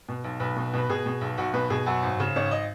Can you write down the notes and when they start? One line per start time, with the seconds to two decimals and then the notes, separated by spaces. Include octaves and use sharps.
0.09 B2
0.24 B1
0.40 B1 B4
0.56 B2
0.74 B2 B4
0.89 B2 G#4
1.06 B2
1.21 B1
1.38 B1 F#4
1.54 B2 B4
1.70 B2 G#4
1.86 F#2 F#4
2.03 G#1
2.20 C#3
2.36 G#1 C#4
2.51 D#5